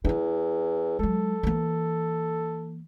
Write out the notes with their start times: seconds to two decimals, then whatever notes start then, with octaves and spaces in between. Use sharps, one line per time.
0.05 E2 D#4 E4
0.99 F#3 G#3 A4
1.43 E3 A#3